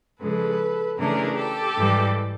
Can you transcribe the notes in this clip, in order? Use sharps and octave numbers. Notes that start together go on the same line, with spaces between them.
C#3 F3 G#3 A4 B4
C#3 E3 A3 D4 G#4 A#4
G4 A4
G#2 E3 G3